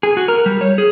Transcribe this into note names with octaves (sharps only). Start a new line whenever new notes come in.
G#4
F#4
A#4
G3
C#5
G#4